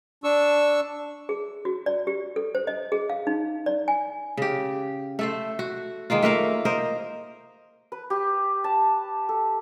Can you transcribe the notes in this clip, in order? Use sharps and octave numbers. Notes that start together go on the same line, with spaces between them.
D4 C#6 E6
G#4
F#4
D5
G4
A4
C5
D#5
G#4
F5
D#4
D5
G#5
C#3 G4
A3 A4 C5
F#4
D#3 G#3 A#3 F4
A3 A#3 A#4 F5
A#4 C5 D#5
B4
G4
A5
A4